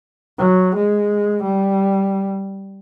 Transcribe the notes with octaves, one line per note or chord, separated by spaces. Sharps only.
F#3
G#3
G3